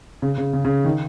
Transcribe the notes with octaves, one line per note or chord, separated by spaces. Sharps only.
C#3
C#3
C#3
C#3
D#3